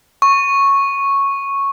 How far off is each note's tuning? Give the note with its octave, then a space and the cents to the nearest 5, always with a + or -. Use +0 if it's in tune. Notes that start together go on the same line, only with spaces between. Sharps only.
C#6 -5